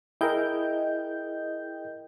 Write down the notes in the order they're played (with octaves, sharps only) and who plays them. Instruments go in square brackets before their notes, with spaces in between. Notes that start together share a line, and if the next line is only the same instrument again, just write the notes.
[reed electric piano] E4 G#4 A#4 [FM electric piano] D#5 G5 G6